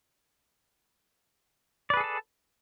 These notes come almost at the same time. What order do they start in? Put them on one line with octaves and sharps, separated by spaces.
D5 B4 G#4 A4 A5